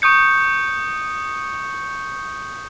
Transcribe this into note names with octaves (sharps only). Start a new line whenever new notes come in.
C#6 D#6 G6 C#7